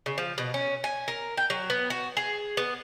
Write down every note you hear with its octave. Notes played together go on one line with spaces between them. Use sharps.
C#3
F3
B2
C#4
G#5
A#4
G5
F#3
B3
F#4
G#4
B3